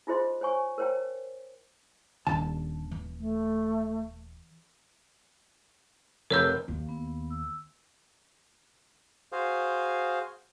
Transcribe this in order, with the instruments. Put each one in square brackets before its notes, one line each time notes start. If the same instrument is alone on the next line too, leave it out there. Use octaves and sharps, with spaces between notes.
[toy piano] D#4 F4 G#4 C5 D#5 C6
C5 C#5 G#5 C#6
A#4 C5 C#5 G5 A5
[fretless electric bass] D#1 [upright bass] D#3 D4 [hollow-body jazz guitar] A5
[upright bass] E3
[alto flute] A3
[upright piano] F1 G6 [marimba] A#4 C#5 E6
[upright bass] D#2
[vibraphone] B3
E6
[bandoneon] F#4 G#4 C5 F5